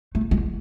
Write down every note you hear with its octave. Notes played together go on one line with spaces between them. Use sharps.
A3
G#3